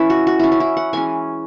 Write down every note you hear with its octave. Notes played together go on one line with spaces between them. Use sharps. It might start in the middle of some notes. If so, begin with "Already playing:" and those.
Already playing: E3 C#4 E4 B4
F#4
F#4
C#4 E4
C#4
E4
F#5
E3 G#3 C#4 G#5